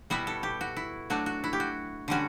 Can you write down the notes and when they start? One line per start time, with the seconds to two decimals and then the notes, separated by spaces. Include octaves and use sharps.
0.10 B2 G3 B3 E4 F#4
0.27 A4
0.43 G4
0.61 F#4
0.76 E4
1.10 F#3 A3 D4 F#4
1.26 F#4
1.44 E4
1.53 G4
1.60 F#4
2.08 D3 G3 C#4 F#4